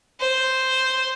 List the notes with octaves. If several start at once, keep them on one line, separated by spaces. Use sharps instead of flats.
C5